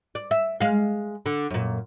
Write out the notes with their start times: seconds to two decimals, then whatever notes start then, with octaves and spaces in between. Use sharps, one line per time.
0.15 D5
0.31 E5
0.61 G#3 F5
1.26 D3
1.50 F#2 A#2